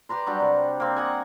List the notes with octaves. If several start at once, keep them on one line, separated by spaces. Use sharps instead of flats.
G4 B4 A#5 C6
F#3 G3 D4 G5
C3
A#3 C4
D#5 F#5 G#5